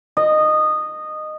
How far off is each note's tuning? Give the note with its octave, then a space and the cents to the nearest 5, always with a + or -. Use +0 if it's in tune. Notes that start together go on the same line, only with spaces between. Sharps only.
D#5 -15